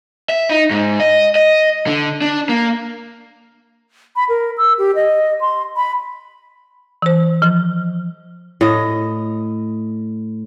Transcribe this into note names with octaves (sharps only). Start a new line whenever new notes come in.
E5
D#4
G#2
D#5
D#5
D3
D4
A#3
B5
A#4
E6
G4
D#5
C6
B5
E3 C5
F3
A2 D#5